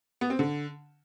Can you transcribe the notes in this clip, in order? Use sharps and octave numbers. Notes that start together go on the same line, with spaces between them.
B3
C4
D3